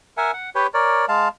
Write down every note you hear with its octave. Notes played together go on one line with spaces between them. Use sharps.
A#4 E5 F#5 G#5
F#5
G4 B4 C#5 G5
A#4 C#5 D5
G#3 F5 A5